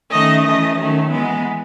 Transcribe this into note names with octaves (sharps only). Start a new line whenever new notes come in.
D#3 A3 C#4 D#5
E3 A3 C#4 D#5
D#3 F#3 A3 C#4
E3 G#3 B3